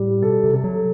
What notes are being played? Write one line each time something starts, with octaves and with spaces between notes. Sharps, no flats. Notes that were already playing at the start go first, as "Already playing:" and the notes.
Already playing: A2 G3
B2 A4
C3
A4
F#3